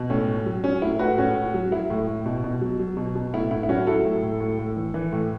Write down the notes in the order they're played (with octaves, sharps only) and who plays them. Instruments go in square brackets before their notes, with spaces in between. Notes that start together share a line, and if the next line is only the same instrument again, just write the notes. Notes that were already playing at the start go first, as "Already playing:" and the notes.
Already playing: [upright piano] B2
A2 C#4
A2
F#3
F#3 C#4
A2 E4
A2 F#4 B4
A2 C#4 F#4
A2
F#3
F#3 E4
A2
A2
B2
B2
F#3
F#3
B2
B2
A2 E4
A2 E4
E4
F#3 C#4 F#4
F#3 E4 A4
A2
A2
A2
A2
E3
E3
A2